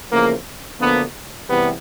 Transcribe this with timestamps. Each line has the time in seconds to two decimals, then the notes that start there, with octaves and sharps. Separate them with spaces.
0.11 E2 C#3 F3 A3 A#3
0.80 D2 D3 F3 A#3 B3
1.48 E2 C3 E3 G3 B3